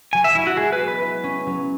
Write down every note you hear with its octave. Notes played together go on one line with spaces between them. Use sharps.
F#3 G#5
E5
F#3 E4
F#4
G#3 G#4
B4
B3
B4
E4
C#4
F#3